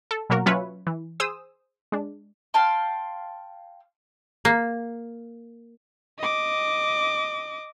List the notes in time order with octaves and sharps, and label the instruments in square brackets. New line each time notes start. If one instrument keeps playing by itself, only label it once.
[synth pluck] A4
B2 F#3 A#3 F#4 A#4
F#3 C#4 F4 B4 C#5 E5
E3
G#4 C5 D#6 E6
G#3 D4
[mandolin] F5 G5 A5 C6
[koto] A#3
[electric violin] D#5 D6